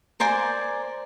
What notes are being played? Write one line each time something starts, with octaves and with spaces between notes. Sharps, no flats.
A#4 C5 D5 G#5